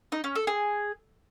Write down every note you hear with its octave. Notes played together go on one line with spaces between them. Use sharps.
D#4
C#4
A4
G#4